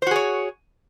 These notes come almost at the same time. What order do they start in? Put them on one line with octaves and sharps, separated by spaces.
C5 F#4 G#4 C#5